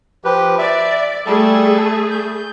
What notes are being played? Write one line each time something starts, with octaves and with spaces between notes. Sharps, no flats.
F3 G4 B4
D5 E5
G3 A3 G#4 A4
G6